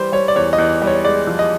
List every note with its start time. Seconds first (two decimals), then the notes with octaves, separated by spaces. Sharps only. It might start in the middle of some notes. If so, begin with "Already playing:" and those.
Already playing: E3 G3 C5
0.12 G3 C#5
0.28 D5
0.36 E2 C#5
0.53 D#5
0.58 E2
0.82 G3
0.87 C#5
1.05 G#3 D5
1.27 F3
1.39 D#5